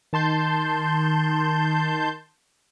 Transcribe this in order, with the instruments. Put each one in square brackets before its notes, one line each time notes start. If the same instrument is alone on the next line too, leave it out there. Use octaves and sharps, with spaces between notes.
[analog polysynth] D#3 A5 C6 G6